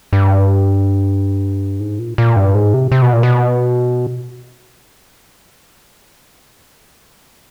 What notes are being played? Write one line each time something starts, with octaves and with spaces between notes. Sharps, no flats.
G2
G#2
A#2
A#2
G2
G#2
C3
C3
B2
A#2
B2